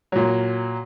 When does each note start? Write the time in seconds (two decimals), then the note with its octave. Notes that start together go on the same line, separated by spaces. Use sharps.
0.12 A#2 F#3